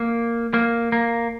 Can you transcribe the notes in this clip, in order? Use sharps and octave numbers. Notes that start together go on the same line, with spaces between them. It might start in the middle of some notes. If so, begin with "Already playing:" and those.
Already playing: A#3
A#3
A#3